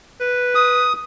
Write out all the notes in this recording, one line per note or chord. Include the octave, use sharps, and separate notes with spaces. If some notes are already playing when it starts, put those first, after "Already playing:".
B4
D#6